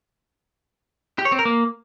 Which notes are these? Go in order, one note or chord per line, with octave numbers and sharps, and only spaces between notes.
G4
C#5
C4
A#4
A#3